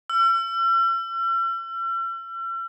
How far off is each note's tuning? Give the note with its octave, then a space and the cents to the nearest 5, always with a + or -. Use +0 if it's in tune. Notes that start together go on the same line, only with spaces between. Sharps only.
E6 +45